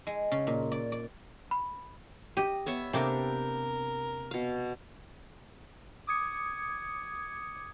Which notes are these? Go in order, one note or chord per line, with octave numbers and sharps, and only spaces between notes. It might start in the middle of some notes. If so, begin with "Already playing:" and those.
G#3
C#3
A#2
D5
D5
B5
G4 D#5
B3 C#5 E5
C3 A#3 D4 G4 A4 A#4
B2 F5
D6 D#6 G#6 C#7